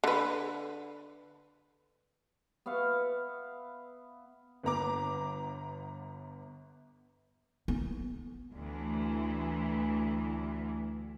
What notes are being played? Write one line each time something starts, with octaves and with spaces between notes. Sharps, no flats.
D3 B4
B3 E5 F5 C#6
G1 B3 A#5 D6
B3
D2 E3